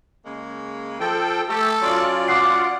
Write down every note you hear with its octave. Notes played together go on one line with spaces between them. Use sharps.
C#3 G#3 A#3
F3 A4 G5
A3 G4 A4
F#3 C#4 F4 D5
F#5 D6 D#6 C7